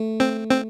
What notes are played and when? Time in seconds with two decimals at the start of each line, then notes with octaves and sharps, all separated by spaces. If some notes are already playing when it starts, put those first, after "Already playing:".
Already playing: A3
0.20 C4
0.50 C4